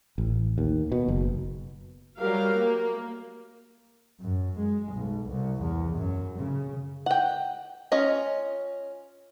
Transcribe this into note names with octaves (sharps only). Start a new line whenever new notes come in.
A1
D#2
B2
F#1
F#3 G3 G4 A#4 F5
A#3
F#2
G#3
B1
C2
E2
F#2
C#3
F#5 G5
C#4 F4 D#5